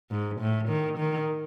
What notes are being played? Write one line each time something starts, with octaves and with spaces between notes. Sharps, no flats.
G#2
A2
D#3
D#3